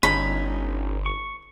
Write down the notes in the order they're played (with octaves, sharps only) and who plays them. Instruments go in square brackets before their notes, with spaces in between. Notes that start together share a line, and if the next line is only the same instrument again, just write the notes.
[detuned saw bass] G1 [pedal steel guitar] C#4 D#4 [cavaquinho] B5
[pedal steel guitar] C#6